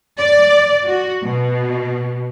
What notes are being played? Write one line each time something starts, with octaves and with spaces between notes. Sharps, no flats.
D5
F#4
B2